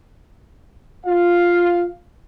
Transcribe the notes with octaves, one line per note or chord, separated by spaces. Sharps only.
F4 F5